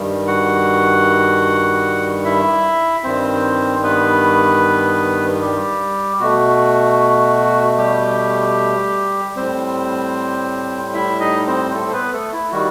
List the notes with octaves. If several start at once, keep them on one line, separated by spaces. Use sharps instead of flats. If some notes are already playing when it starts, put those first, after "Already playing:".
Already playing: G2 D#3 G3
F#4 F#5
E4 E5
G2 D#3 G3 C4 C5
B3 B4
G3 G4
B2 A3 F#4
G3 G4
A2 G3 C4 C5
E4 E5
D#4 D#5
C4 C5
A3 A4
C5
B3 B4
A3 A4
E4
D#3 G3 F#4